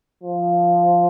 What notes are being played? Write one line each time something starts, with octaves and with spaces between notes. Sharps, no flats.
F3